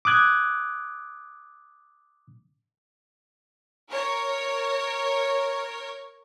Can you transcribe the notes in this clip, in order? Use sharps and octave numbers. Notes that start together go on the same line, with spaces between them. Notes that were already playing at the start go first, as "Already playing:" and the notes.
D6 D#6 F#6 G#6
A#4 C#5